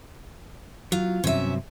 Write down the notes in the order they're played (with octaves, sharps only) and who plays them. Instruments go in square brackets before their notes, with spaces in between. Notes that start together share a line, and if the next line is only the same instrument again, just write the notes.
[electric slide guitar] F#3 [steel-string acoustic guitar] F4
[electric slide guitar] G2 C3 F#3 [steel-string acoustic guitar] C#4 E5